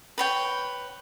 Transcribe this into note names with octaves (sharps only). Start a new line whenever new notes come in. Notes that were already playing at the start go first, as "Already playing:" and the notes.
B4 C#5 G5